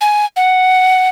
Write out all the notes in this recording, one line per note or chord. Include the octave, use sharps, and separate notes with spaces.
G#5
F#5